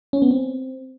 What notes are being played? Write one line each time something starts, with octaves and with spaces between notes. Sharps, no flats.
C#4
B3
C4